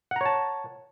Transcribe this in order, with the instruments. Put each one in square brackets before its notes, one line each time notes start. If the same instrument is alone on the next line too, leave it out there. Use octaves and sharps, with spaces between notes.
[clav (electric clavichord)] F#5
A#5
C#5
A5